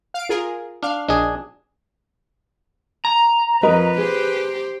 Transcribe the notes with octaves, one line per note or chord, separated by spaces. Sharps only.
F5 D7
F4 G#4 A#4
D4 F5 F6
A#1 D4 G#4 D#5
A#5
F2 A#4 B4 D#5
G4 G#4 C5